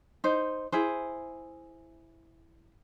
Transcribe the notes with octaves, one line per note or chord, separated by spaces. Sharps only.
D#4 C5
E4 G#4 C5